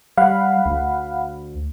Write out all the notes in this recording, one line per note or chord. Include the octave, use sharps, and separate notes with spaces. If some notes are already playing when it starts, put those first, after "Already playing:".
G3 F5 F#5 B5
D2